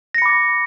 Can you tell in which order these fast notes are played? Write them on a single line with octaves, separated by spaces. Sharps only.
A#6 C#7 B5 D6 A6